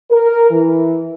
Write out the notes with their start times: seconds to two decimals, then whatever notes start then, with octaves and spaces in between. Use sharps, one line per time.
0.10 A#4
0.50 E3